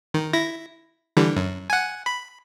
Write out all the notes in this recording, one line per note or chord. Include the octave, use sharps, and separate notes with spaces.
D#3
E4 A#6
D3 E3 G3
F#2
F#5 G#5
B5